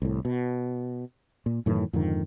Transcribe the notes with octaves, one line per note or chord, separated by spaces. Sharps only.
C2 A2
B2
A#2
F#2 A2 D#3 E3
F2 G#2 D3 D#3